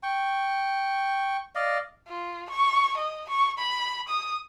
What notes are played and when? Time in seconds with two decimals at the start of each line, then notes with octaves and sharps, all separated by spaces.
0.03 G5 C#6
1.55 D5 D#5 F5
2.08 F4
2.50 C#6
2.97 D#5
3.29 C#6
3.58 B5
4.08 D#6